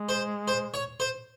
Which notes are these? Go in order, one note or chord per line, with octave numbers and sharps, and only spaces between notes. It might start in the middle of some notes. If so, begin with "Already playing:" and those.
Already playing: G#3
C5
C5
C#5
C5